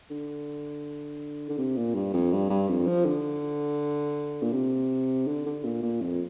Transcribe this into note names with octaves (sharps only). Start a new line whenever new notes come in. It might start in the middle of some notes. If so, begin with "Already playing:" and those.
D3
D3
C3
A#2
G2
F2
G2
G2
F2
F3
D3
A#2
C3
D3
D3
A#2
A#2
F2